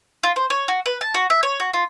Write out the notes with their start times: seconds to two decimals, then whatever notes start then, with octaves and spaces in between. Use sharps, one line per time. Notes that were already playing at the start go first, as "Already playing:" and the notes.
0.23 F4
0.36 C5
0.50 C#5
0.68 F#4
0.86 B4
1.01 A5
1.14 F#4
1.30 E5
1.43 C#5
1.60 F#4
1.74 F4